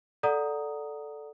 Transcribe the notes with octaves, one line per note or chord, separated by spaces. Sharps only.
A4 D5 F#5 A#5 D#6